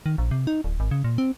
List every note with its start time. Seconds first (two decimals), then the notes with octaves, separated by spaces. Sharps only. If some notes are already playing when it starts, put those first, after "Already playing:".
0.06 D#3
0.18 A#1
0.31 C3
0.47 D#4
0.64 D1
0.80 G#1
0.91 C#3
1.04 A#2
1.18 C4